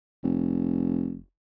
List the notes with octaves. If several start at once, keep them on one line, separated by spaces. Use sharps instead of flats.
F1